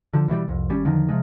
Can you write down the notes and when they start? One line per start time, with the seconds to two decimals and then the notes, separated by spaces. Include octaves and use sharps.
0.13 D3 F3
0.28 B2 E3 F#3 G3
0.48 C2 F2
0.69 G#1 G3 C#4
0.85 E2 D3 D#3 F3
1.09 C3 F3 G#3